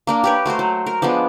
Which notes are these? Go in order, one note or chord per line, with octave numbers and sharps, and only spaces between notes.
A#3 D4 A#4
G4 B4 C#5
A3 F#4 A#4 C5
F#3
A#4
F3 G#3 B3 D4